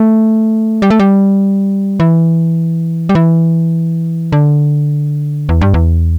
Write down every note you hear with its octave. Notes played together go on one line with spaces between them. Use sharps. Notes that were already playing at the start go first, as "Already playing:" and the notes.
Already playing: A3
G3
A3
G3
E3
G3
E3
D3
E2
G2
E2